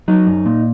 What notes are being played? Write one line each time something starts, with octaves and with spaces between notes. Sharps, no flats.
F#3 D#4
F#2
A#2